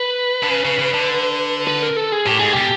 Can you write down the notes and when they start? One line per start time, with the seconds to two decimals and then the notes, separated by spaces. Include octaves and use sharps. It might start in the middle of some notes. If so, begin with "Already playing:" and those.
Already playing: B4
0.43 D3
0.49 C#3
0.65 C#3
0.79 C#3
0.94 D3
1.67 B4
1.83 A#4
1.96 A4
2.12 G#4
2.26 A2 G4
2.39 G#2 G#4
2.53 B2 G4